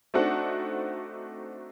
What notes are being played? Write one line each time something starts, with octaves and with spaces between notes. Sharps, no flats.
A3 C4 D4 D#4 F#4 F#5